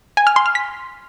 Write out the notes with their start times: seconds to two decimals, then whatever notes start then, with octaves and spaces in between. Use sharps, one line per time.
0.17 G#5
0.27 F6
0.36 C6
0.46 F6
0.55 B6